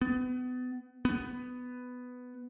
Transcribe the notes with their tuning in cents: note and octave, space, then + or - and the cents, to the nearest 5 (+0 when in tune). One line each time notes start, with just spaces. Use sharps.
B3 +30
B3 +10